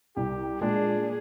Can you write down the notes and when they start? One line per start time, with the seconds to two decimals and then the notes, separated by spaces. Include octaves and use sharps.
0.17 C2 G4
0.62 A#2 G#3 D4 G#4